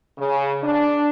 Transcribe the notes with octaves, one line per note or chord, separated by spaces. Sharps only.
C#3
D4